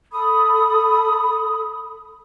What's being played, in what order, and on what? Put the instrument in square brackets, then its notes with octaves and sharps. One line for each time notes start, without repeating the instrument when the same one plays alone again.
[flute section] A4 B5 D#6